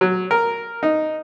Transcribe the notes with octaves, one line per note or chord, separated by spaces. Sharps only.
F#3
A#4
D#4